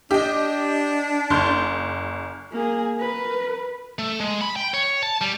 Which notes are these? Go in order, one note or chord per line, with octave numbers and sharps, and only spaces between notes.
D4 G4 D#5
F#1 C6 G6
A#3 G#4
A#4 B4
A3
G#3
B5
G5
C#5
A5
G3